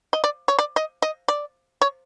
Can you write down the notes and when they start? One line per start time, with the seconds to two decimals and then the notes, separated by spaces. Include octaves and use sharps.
0.13 D#5
0.24 D5
0.48 C#5
0.59 D5
0.76 D#5
1.02 D#5
1.28 D5
1.82 C#5